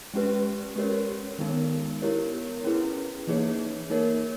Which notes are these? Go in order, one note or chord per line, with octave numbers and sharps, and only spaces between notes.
G#3 C#4 G4 B4
G#3 C#4 G4 A#4 C#5
D#3 G#3 B3 D#4 A#4
B3 E4 G4 A#4 C#5
C#4 E4 G#4 B4
E3 A#3 D#4 G#4 C#5
A#3 D#4 A#4 C#5